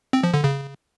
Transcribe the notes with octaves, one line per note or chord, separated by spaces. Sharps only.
C4
F3
D3
C#3